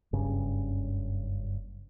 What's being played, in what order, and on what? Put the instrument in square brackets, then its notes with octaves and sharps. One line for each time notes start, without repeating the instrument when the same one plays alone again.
[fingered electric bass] F#1 G2 C#3 C#4